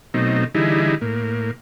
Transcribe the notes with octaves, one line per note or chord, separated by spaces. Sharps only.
B2 F#3 A3 C4 D#4
D3 E3 G3 D#4 E4 G#4
A2 A#3